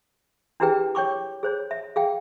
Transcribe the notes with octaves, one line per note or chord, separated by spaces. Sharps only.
D4 E4 G4 G#4 B4 G5
C#5 G5 C#6 D6
G#4 C5 C#5
E5
G#4 F5 G5